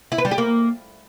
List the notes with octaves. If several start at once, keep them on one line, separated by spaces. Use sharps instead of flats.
E4
B4
G3
G4
A#3